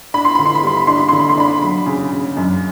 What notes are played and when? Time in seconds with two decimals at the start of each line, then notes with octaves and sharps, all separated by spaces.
0.14 D4 B5
0.25 C6
0.35 D3 B5
0.46 C6
0.55 B5
0.64 G3 C6
0.77 B5
0.87 D4 C6
0.98 B5
1.08 D3 C6
1.19 B5
1.29 C6
1.38 D4 B5
1.62 F#3 B5
1.86 C#3
2.12 C#3
2.37 F#2